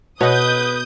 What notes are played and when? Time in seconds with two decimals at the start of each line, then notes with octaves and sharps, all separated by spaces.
0.21 B2 B4 C#5 D#5 F#5 D#6 G6